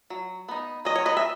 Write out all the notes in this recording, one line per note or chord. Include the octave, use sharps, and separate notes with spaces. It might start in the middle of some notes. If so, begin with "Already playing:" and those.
F#3
B3 D#4
F#3 D#5
C#5
B4 D#5
E5